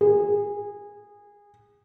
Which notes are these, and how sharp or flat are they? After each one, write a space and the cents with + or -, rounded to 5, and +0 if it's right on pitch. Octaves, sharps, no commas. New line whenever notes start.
G#4 -20